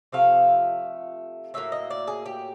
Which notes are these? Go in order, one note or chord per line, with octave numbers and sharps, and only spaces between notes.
C3 F3 A3 F5
A2 F#3 A#3 E5
D#5
D5
G#4
G4